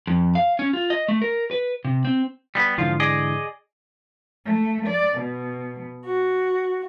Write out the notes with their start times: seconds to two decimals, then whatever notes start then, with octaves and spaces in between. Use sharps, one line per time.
0.07 F2
0.35 F5
0.59 C#4
0.73 F4
0.90 D#5
1.08 A3
1.22 A#4
1.51 B4
1.85 C3
2.05 C4
2.55 G3 B3
2.78 G#2 D3 E3 F3 F4
3.00 G#4 D5 D#5
4.45 A3
4.87 D5
5.20 B2
6.06 F#4